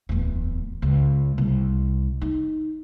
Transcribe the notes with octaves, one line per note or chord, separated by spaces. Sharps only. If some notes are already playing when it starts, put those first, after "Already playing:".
D1 E2
C#2
C2
D#4